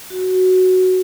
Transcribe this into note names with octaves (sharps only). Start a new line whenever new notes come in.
F#4